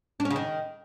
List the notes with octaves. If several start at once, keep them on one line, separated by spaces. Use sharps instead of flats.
D4
C#4
C#3
D#3